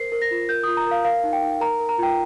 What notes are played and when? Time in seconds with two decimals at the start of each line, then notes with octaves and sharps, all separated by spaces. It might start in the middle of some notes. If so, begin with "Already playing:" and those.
Already playing: A#4 C5 C7
0.12 A#4
0.22 A#6
0.31 F4
0.49 A#4 G6
0.63 F4 D#6
0.77 A#5
0.86 A#4 F5
1.05 A#4 F5
1.24 D#4
1.33 G5
1.42 D#4
1.61 A#4 A#5
1.79 A#4
1.89 A#5
1.98 F4 G5